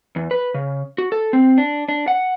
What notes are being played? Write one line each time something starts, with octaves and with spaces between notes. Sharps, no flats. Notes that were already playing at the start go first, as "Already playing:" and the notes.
E2
B4
C#3
F#4
A4
C4
D4
D4
F#5